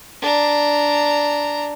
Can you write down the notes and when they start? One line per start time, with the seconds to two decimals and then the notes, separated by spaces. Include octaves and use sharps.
0.21 D4 A#5